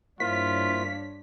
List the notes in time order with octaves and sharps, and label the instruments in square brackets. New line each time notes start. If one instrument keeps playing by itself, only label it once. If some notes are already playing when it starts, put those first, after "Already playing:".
[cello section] G2 D4 C#5 [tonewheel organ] A#3 E4 C5 [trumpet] F4 [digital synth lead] B6